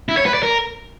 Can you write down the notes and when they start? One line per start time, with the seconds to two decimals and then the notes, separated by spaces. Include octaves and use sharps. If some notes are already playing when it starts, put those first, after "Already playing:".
0.09 E4
0.17 C#5
0.26 B4
0.34 D5
0.43 A#4